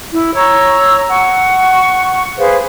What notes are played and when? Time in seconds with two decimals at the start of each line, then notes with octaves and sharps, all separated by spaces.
0.13 E4
0.35 C#5 A#5 C#6 E6
1.08 F#5 C#6
2.38 G#4 B4 C5 F5